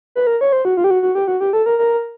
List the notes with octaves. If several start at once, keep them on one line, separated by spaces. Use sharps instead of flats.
B4
A#4
C#5
C5
F#4
F4
G4
F#4
F#4
G4
F#4
G4
A4
A#4
A#4